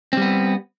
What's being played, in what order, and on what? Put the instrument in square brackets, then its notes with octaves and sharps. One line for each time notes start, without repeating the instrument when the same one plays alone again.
[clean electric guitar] C4
G3
B3